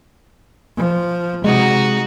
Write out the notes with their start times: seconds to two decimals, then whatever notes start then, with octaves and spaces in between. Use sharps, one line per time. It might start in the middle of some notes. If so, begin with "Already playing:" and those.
0.77 F3
1.44 C3 G#3 D#4 F#4